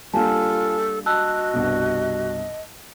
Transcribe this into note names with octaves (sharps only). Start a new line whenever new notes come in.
G3 A#3 D4 F4 A4 G#5 A5
F#4 D#5 A5 E6 F#6
C2 G2 B2